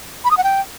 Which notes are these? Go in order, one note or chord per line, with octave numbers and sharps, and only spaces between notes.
B5
D#6
F#5
G5